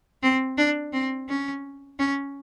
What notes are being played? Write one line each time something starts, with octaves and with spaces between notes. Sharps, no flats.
C4
D4
C4
C#4
C#4